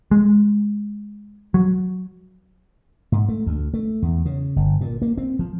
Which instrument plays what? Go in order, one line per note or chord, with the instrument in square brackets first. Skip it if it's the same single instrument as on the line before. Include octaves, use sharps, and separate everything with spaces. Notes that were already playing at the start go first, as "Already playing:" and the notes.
[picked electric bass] G#3
F#3
[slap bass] G#2
A3
D2
A3
E2
C#3
G1
A#2
A#3
C4
F3